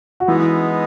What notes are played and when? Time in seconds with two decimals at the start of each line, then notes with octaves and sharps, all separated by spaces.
0.20 F#4
0.27 E3 G#3 B3 D#4 E4